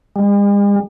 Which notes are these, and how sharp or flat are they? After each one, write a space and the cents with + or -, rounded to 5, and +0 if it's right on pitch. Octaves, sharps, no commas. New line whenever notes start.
G#3 -45